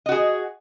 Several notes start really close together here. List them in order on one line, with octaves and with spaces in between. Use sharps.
D#5 F#4 G#4